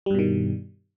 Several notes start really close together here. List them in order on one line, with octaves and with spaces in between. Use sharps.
G3 G2 B2 D#3